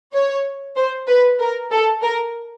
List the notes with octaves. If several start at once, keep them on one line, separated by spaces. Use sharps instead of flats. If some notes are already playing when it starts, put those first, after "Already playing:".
C#5
C5
B4
A#4
A4
A#4